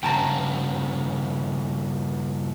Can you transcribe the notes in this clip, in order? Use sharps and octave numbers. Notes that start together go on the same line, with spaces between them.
G2 C#3 F#4 G5 A5 A#5